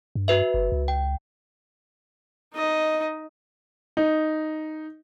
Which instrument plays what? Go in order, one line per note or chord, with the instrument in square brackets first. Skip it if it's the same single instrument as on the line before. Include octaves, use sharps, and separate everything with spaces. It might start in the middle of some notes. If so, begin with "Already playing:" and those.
[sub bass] G2
[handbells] F#4 B4 E5
[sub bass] G1
C#2
[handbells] G5
[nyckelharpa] D#4 D#5
[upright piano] D#4